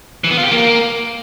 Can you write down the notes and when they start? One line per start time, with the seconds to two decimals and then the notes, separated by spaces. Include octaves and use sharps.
0.24 E3
0.31 B3
0.37 F4
0.44 G4
0.51 A#3